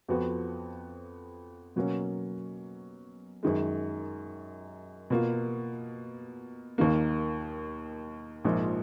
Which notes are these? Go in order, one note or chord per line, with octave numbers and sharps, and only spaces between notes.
F2 F3 B3 F#4
B2 F#3 A#3 C#4
F#2 D#3 G#3
B2 A#3 F4
D#2 D#3 A#3
A#1 G#2 F3 A#3